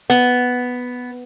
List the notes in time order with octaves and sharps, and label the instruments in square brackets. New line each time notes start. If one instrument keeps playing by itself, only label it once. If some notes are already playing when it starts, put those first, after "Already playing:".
[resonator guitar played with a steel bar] B3